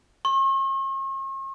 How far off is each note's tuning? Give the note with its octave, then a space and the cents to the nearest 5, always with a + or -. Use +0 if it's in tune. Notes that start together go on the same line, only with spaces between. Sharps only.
C#6 -45